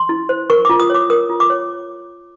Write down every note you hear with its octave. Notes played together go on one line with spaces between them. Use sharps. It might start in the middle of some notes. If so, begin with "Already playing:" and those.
Already playing: C6
E4
C5
A#4 C#6
F4 D6
D#6
C#5 D6
A#4 D#6
F4
D6
C#5